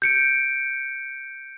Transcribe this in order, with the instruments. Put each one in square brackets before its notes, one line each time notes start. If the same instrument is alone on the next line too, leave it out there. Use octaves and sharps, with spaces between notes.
[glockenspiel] G6 C#7 D7